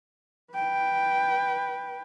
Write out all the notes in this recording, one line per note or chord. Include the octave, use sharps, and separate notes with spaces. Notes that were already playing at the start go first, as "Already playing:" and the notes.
B4 G5